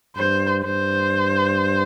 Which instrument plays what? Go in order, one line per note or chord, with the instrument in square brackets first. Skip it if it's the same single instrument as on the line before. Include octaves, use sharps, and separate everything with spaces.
[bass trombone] G2 [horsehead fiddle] C5
[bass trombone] G2 [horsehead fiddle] C5